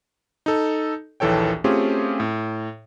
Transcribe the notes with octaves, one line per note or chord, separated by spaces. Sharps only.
D#4 A4
A#1 D#2 E3 A4 C#5 G5
A3 C4 C#4 F4 G4 G#4
A2